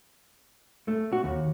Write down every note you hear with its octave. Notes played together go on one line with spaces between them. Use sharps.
A3
F#4
D#2